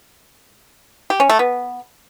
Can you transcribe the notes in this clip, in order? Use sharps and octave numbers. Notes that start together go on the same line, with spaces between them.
G4
C#4
A3
B3